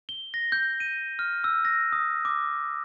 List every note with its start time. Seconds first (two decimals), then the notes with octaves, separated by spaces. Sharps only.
0.09 G7
0.34 A#6
0.52 G6
0.80 D#7
1.19 F6
1.44 E6
1.65 A#6
1.92 D#6
2.25 D6